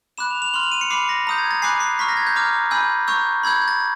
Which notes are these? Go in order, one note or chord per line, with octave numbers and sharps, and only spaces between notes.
B5 D6 F#6 E7
F7
F7
C6 F6 F#7
F7
D#7
C#7
B5 D6 F6 C7
A#6
A#5 D#6 G6
G#6
A6
G#5 B5 D6 F#6 C7
C7
A#5 C#6 F6 B6
A#6
G#6
G6
A#5 D6 F6
G#5 B5 E6 G6
A#5 C#6 E6 G6
B5 E6 G6 G#6
G#6
A6